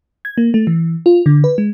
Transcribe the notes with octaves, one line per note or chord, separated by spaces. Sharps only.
G#6
A#3
A3
E3
F4
D3
B4
G#3